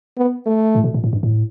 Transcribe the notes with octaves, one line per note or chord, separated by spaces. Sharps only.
B3
A3
A2
B2
A#2
A2
G2
A2